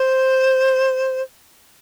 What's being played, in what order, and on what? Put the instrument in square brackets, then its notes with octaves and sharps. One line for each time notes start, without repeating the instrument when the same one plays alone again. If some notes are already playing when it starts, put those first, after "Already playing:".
Already playing: [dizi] C5